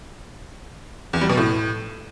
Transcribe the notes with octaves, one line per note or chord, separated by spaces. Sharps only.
E2
G3
B2
A2